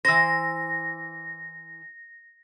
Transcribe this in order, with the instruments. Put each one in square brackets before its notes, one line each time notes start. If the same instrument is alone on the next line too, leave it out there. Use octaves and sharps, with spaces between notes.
[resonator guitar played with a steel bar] E3 C5 [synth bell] A#6